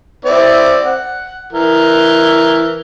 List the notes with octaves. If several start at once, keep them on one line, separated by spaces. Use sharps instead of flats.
C4 E4 D5
F#5
E3 A#4